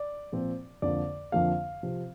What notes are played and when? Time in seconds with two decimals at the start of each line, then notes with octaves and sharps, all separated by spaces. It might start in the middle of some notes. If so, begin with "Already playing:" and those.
Already playing: D5
0.32 A#2 F3 C4
0.82 F2 D3 F3 A#3 D5
1.32 F2 D3 F3 A#3 F5
1.83 C3 F3 C4